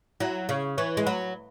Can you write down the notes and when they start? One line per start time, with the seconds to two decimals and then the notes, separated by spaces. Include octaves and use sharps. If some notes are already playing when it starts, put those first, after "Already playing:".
0.20 F#3 E4
0.49 C#3 C#5
0.78 E3 C#5
0.97 G#3
1.06 F#3 B4